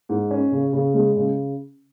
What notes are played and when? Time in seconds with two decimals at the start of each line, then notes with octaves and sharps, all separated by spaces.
0.09 G#2
0.31 C#4
0.52 C#3
0.73 C#3
0.94 G#3
1.16 C#3